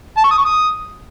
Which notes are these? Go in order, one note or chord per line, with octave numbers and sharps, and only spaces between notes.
A5
C#6
D#6
C#6
D#6